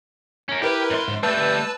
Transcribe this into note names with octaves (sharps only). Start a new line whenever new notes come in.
C#4 A#4
E4 G4 A#4 B4
F#2 C6
G#2
G3 A3 B4 A5 E6